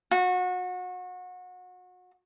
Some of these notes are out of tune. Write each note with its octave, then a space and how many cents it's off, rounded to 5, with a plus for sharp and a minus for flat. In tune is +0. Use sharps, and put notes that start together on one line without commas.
F#4 -30